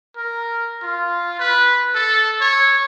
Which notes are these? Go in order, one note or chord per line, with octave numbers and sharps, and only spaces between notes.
A#4
F4
B4
A4
C#5